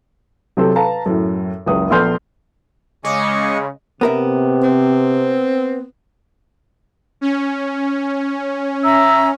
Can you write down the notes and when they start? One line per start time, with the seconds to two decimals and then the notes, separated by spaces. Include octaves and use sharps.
0.57 C3 F#3 C4 A4
0.75 B4 F5 A5 A#5
1.06 F#2 A2
1.66 F#1 C#2 D#6
1.90 A#1 A3 B3 C6 F6 G6
3.04 C#3 G#3 D#5 G#5 C#6 D6
4.01 C3 B3 A#4 E5
4.63 C4
7.21 C#4
8.83 E5 A#5 E6